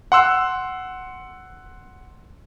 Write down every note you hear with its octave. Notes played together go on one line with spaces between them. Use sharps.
F#5 C6 E6 F#6